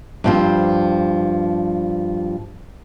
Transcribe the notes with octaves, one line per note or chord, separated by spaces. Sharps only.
G2 F3 C4